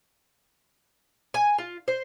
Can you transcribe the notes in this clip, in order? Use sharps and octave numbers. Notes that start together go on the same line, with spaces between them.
G#5
F4
C5